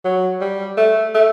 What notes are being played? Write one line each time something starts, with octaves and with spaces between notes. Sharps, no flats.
F#3
G3
A3
A3